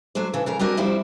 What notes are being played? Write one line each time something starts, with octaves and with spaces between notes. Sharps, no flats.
F#3 A3 D4 C5
C#3 E3 A4
F2 C#3 A#4
G3 C4 D4 F#4 A#4 D#5
F2 F3 G3 E4 C5